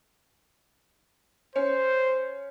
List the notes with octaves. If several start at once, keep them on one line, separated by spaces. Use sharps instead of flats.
C#4 C5